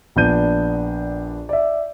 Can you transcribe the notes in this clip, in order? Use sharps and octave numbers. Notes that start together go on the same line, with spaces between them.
A#1 B3 D4 G6 D#7
D5 E5